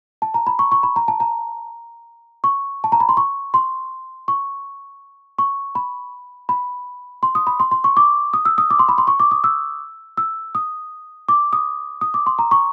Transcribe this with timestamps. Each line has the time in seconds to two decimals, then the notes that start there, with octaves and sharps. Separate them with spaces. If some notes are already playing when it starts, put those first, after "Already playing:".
0.22 A5
0.34 A#5
0.47 B5
0.59 C#6
0.72 C#6
0.83 B5
0.96 A#5
1.08 A5
1.20 A#5
2.44 C#6
2.84 A5
2.92 A#5
3.00 B5
3.09 C6
3.17 C#6
3.54 C6
4.28 C#6
5.39 C#6
5.75 B5
6.49 B5
7.23 C6
7.35 D#6
7.47 B5
7.60 C6
7.71 C6
7.84 C#6
7.97 D6
8.34 D#6
8.45 E6
8.58 D#6
8.70 D6
8.79 C6
8.89 B5
8.98 C6
9.07 C#6
9.20 D6
9.31 D#6
9.44 E6
10.17 E6
10.55 D#6
11.29 D6
11.53 D#6
12.01 D#6
12.14 D6
12.26 C6
12.39 A#5
12.51 C#6